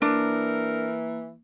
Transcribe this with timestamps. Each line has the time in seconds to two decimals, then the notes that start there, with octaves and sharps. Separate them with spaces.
0.02 E3 A#3 D4 A#4